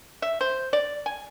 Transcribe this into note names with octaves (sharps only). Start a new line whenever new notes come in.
E5
C5
D5
G#5